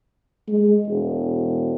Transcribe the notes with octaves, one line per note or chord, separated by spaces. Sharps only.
G#3
E1